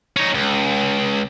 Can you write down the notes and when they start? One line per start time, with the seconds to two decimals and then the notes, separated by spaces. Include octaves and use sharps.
0.17 C#4 D#4
0.35 C#2